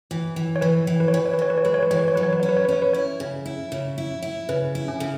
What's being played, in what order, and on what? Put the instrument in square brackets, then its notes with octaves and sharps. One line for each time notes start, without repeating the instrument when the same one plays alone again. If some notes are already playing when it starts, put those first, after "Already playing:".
[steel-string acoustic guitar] E3
E3
[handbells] C#5
[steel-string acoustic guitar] E3 [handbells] B4
[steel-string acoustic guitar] E3
[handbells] B4
C#5
[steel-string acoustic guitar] E3 [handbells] B4
[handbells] C#5
B4
[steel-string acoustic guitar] E3 [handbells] C#5
[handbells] B4
C#5
[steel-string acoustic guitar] G#3 [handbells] B4
[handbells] C#5
B4
[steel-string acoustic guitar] E3 [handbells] C#5
[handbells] B4
C#5
[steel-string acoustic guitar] F#3 [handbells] B4
[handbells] C#5
B4
[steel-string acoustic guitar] C#4 [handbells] C#5
[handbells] B4
C#5
B4
[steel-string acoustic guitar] C#4 [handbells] C#5
[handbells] B4
[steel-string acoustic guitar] E4 [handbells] C#5
[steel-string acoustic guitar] C#3
E4
C#3
E4
E4
[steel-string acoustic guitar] C#3 [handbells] B4
[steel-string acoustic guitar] E4
[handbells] C#4
[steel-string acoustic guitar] C#3